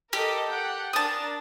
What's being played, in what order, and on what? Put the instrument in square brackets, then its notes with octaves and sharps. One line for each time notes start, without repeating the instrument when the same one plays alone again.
[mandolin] G4 [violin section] A4 A#4 D#5
[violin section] F#5 G5 A5
[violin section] D4 A#4 [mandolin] A5 D#6